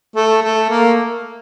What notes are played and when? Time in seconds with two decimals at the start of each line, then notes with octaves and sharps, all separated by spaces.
0.16 A3
0.42 A3
0.70 A#3